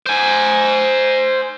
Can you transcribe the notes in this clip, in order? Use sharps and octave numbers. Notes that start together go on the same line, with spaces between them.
C5 G#5